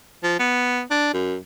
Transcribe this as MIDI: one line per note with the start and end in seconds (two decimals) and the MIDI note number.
0.23 0.37 53
0.40 0.81 59
0.91 1.11 62
1.13 1.36 42